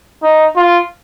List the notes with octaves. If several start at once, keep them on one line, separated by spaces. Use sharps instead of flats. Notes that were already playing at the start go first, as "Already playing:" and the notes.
D#4
F4